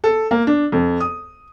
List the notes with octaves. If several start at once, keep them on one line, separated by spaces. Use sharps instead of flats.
A4
A#3
D4
F2
D#6